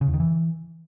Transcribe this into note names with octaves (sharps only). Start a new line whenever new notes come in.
C#3
E2
D#3
E3